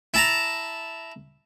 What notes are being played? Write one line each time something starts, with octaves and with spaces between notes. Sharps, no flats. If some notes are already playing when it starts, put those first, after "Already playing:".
E4 A5 A#5